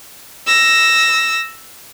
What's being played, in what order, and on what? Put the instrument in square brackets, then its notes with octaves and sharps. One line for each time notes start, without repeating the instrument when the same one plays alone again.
[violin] E6 A#6